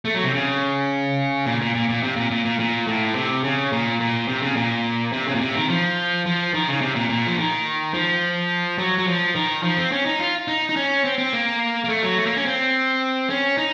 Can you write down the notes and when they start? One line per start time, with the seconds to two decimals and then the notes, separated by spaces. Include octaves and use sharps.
0.05 A3
0.15 F#3
0.24 C3
0.34 C#3
1.46 A#2
1.61 A#2
1.75 A#2
1.89 A#2
2.03 C3
2.16 A#2
2.31 A#2
2.45 A#2
2.60 A#2
2.87 A2
3.15 C3
3.44 C#3
3.72 A#2
4.00 A#2
4.28 C3
4.42 C#3
4.56 A#2
5.13 C3
5.27 C#3
5.35 A#2
5.41 C3
5.55 D#3
5.69 F3
6.26 F3
6.54 D#3
6.68 C#3
6.81 C3
6.95 A#2
7.09 A#2
7.27 F3
7.38 D#3
7.94 F3
8.78 F#3
8.98 F#3
9.08 F3
9.35 D#3
9.63 F3
9.77 C4
9.92 C#4
10.06 D#4
10.19 F4
10.48 D#4
10.69 D#4
10.76 C#4
11.05 C4
11.18 C4
11.33 A#3
11.84 A#3
11.89 A3
12.03 F#3
12.18 A3
12.26 A#3
12.36 C#4
12.46 C4
13.30 C#4
13.58 D#4